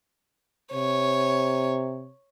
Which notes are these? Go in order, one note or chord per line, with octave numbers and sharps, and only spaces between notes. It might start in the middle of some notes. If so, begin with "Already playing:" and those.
C3 C#5